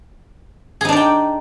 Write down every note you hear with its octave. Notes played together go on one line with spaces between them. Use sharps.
D4 D#4 G#4 D5 G5